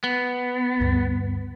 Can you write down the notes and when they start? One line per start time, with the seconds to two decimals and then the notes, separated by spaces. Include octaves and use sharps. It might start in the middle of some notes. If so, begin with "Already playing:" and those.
0.04 B3
0.80 D2 G2